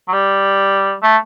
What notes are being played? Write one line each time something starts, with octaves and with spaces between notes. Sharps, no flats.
F#3
G3
A3